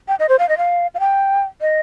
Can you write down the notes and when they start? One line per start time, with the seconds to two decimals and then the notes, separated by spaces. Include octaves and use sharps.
0.08 G5
0.19 D#5
0.29 C5
0.39 F5
0.49 D#5
0.57 F5
0.95 F5
1.00 G5
1.61 D#5